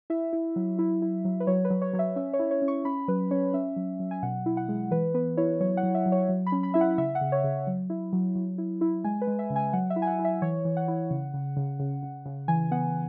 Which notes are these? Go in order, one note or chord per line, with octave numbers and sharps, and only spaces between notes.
E4 E5
E4
F#3
E4
E4
F#3
B4
F#3 C#5
B4
F#3
C#5
F#3 C#5
E5
C#4 E5
C#5
E4
C#5
C#4
C#6
C#4 B5
F#3 B4
C#4 C#5
C#4 E5
F#3
F#3
G#5
B2 F#5
E4
F#5
G#3
E3 B4
B3 B4
E4 C#5
F#3 C#5
F#5
F#3
E5
F#3
C#5
F#3
B5
C#4
B5
E4 E5
F#5
C#3 E5
F#5
C#3
C#5
C#3
F#3
E4
F#3
F#3
E4
E4
G#3 G#5
B4
G#3
E5
C#3
G#5
F#3 F#5
E5
E4
G#5
F#5
E4
E5
E3 C#5
E3
F#5
E4
C#3
C#3
C#3
C#3
C#3
C#3
E3 G#5
B3 F#5